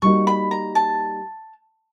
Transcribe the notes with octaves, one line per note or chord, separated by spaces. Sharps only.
G3 A#3 D#4 F#4 C#6
B5
A#5
A5